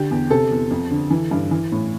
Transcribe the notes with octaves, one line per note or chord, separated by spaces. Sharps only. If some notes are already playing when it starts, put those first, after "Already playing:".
Already playing: D3 G4
E2
C3 A4
E2
F2
D3
E3
G2
E3
A2